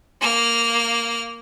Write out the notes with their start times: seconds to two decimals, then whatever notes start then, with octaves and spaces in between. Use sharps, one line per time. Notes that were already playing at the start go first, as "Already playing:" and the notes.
0.21 A#3 F6